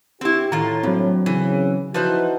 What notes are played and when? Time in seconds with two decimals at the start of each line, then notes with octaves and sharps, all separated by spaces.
0.21 C4 E4 G4
0.52 A2 D#3 F4 A#5
0.83 G2 F#3 C4
1.26 C#3 E3
1.94 F3 D#4 E4 F#4 B4 C5